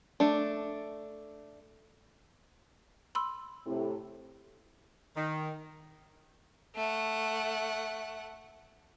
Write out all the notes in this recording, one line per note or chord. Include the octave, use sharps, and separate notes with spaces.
A3 D4
B5 C6 E6
A2 C3
D#3
A3 F#5